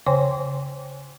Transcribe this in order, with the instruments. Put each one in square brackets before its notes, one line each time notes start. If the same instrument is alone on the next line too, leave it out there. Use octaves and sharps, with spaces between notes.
[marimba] C#3 C5 C#5 G5 G#5 C6